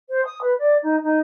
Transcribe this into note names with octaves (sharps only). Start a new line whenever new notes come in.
C5
D#6
B4
D5
D#4
D#4